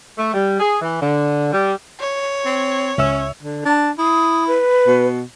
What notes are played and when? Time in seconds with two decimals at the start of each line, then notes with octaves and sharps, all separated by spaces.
0.17 A3
0.33 G3
0.60 G#4
0.81 E3
1.01 D3
1.52 G3
2.00 C#5
2.45 C4
2.98 C#2 C#4 E5 E6
3.43 D3
3.65 D4 A5
3.99 E4 D#6
4.47 B4
4.87 B2